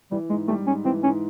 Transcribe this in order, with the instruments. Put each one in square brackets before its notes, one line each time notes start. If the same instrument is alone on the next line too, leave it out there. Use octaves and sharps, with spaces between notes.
[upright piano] E3 [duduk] G3
[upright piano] G#2 [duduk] G#3
[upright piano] G3 [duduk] A3
[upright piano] G#2 [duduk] C#4
[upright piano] E3 [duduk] C4
[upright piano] G#2 [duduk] C#4